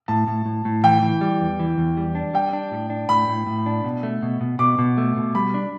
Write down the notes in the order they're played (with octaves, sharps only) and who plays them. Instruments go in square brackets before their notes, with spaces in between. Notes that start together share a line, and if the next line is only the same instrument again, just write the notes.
[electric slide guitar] A2 [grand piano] A5
[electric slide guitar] A2
A2
A2
[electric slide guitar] E3 [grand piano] G5
[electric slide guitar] E3
G3
E2
E3
E2
G3
D4
[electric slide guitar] G3 [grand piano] G5
[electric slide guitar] D4
A2
D4
[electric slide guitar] A2 [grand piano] B5
[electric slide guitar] A2
A2
D4
B2
A3
B2
B2
[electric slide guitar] B2 [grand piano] D6
[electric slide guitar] B2
A3
B2
[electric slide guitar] G3 [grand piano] B5
[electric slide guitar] D4